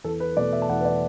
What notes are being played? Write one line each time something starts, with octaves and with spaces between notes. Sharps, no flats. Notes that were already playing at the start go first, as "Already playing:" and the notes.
E2 A4
B4
B2 A3 D5
E5
A5
E2 F#5
B4
D5